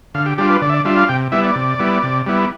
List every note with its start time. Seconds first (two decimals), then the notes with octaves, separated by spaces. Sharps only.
0.14 D3 F5
0.26 G4
0.38 G3 D4 F4 G4
0.50 B4
0.62 D3 D5
0.69 E5
0.74 D5
0.85 G3 D4 F4 E5
0.97 F5
1.09 C3 G5
1.32 G3 B3 E4 E5
1.44 D5
1.55 C3
1.79 G3 B3 E4
2.03 C3
2.26 G3 B3 E4